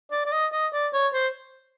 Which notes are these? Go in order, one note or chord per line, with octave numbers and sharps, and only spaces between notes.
D5
D5
D#5
D#5
D5
C#5
C5